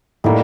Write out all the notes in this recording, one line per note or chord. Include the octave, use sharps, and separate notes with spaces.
A2 D#3 G3 A#3